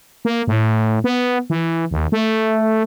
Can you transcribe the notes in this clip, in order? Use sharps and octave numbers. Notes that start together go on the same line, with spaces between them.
A#3
A2
B3
E3
D#2
A3